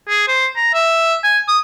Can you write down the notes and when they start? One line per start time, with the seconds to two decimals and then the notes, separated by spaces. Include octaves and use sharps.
0.09 G#4
0.28 C5
0.56 A#5
0.74 E5
1.24 G#5
1.48 D#6